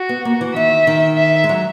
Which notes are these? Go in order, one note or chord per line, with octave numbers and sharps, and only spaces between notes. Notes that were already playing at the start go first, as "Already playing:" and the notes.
Already playing: F#4
B3
A#3
E3
D#3 E5
D#3
E5
G#3
F#3